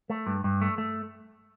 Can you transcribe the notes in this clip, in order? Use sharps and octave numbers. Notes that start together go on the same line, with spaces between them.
A3
G2
G2
A3
A3